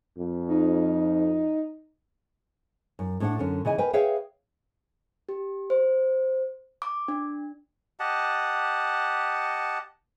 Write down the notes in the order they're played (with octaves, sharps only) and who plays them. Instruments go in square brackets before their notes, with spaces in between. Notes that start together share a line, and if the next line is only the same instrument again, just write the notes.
[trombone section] F2
[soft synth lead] D#4
[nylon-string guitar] F#2
A2 D4 F#5
F#2 D3 C#4
C#3 E3 D#5 G#5
A#4 B4 D#5 G5 G#5
G#4 B4 C#5 E5 F5 G5
[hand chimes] G4
C5
D6
D4
[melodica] G4 D#5 F#5 A5